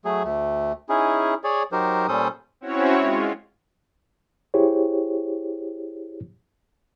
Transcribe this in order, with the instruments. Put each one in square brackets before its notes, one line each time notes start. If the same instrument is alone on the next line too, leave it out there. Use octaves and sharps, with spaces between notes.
[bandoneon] F#3 A3 G#4
D2 A3
C#4 D#4 E4 G#4
G#4 C#5 D5
F#3 D#4 G4 A#4 C5
A#2 G3 C#4 A4 C5 D#6
[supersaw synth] C4 C#4 E4 F#4 C#5
G#3 F4
[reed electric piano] E4 G4 G#4 C5 C#5